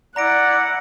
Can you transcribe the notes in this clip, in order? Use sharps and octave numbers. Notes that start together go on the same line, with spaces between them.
E4 D5 F#5 A#5 D6 A#6 D7